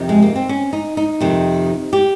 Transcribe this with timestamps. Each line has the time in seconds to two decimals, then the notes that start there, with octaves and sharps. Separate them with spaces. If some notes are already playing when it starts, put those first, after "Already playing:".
Already playing: F2 C3 D#3 D#4
0.09 G#3
0.22 A#3
0.36 C4
0.49 C#4
0.73 D#4
0.97 D#4
1.20 F2 C3 D#3
1.93 G4